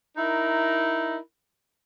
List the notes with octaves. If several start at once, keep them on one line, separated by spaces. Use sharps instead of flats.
D#4 E4 A#4